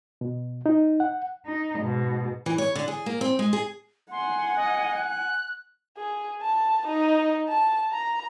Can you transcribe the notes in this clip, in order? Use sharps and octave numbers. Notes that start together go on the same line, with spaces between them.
B2
D#4
F#5
D#4
G#2 B2
E3
C#5
D3
G#4
A#3
C4
G#3
G#4
F#5 G#5 C6
D#5
F#6
G#4
A5
D#4
A5
A#5